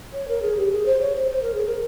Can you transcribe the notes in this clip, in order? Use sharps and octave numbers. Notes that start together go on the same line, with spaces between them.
C#5
A#4
G#4
G4
G#4
C5
C#5
C5
C5
A#4
G#4
A#4